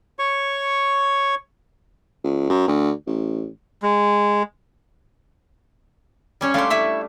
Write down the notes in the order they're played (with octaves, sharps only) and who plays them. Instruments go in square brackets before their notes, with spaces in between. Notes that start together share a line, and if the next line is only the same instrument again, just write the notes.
[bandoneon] C#5 C#6
[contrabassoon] C#2
F#2
D2
A1
[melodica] G#3
[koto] G3 C#4 C#5
[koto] G3 A3 D4 [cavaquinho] F5 C6
[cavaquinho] E4 E5 C#6